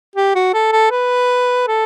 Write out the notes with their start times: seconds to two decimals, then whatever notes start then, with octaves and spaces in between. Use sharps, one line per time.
0.16 G4
0.35 F#4
0.54 A4
0.72 A4
0.91 B4
1.68 A4